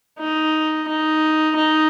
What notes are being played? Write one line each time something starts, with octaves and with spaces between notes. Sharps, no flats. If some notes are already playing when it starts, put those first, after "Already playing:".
D#4
D#4
D#4